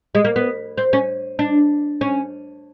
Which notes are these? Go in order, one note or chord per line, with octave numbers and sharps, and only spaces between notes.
G#3
A#3
B3
C4
C#4
D4
C#4